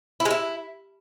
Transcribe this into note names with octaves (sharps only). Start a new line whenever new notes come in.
E4
G#3
E4